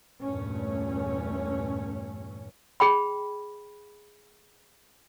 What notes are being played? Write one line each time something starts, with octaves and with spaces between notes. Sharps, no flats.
E2 G2 A#2 A3 C#4
G#4 G5 B5